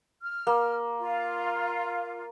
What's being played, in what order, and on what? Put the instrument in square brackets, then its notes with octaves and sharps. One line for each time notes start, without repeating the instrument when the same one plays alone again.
[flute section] F6
[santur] A#3
[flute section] F4 F5